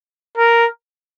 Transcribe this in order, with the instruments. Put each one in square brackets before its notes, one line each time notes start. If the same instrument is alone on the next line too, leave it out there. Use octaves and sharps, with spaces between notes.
[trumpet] A#4